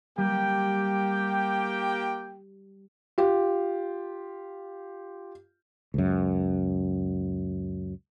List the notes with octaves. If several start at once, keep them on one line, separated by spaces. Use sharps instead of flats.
G3 A#3 G4 G5
F4 G4
C#2 F#2